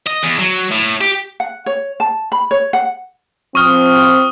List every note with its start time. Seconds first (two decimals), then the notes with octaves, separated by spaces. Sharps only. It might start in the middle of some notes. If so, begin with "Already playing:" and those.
0.07 D#5
0.23 E2
0.39 F#3
0.72 A2
1.01 G4
1.40 F#5
1.66 C#5
2.00 A5
2.32 B5
2.51 C#5
2.73 F#5
3.55 F3 C4 C#6 D#6 F6